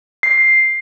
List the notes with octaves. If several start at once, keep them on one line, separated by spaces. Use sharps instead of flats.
C7